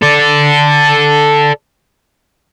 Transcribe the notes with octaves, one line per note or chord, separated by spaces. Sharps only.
A4 D5